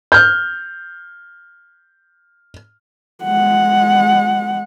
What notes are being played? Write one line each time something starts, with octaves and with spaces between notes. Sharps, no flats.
F6 G6
G#3 F#5